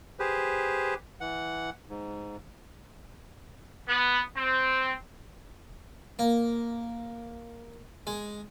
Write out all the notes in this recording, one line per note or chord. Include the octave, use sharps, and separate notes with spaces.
G4 G#4 B4 C5
E3 F#5
G#2
B3
C4
A#3
G#3